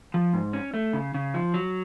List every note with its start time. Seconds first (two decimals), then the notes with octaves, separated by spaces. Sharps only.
0.14 F3
0.33 G#2
0.53 C#4
0.74 A3
0.93 C#3
1.14 C#3
1.34 F3
1.54 F#3